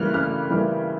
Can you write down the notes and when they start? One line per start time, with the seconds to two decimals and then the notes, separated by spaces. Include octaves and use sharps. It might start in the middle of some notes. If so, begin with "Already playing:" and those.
Already playing: C#3 E3 G3 A#3 F6 F#6
0.14 C#3 F6
0.50 E3 G3 A#3